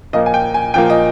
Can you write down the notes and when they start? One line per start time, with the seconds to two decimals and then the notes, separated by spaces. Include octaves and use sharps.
0.13 A#2 F3 A#3 D#5
0.26 G#5
0.34 G5
0.54 G#5
0.74 A#2 F3 A#3 G5
0.90 D#5